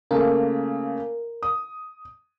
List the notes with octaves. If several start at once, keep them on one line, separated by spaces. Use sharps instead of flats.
C#3 A3 A#3 A#4
D#6